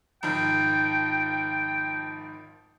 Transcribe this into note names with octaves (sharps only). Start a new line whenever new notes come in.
G#1 D#3 F3 G5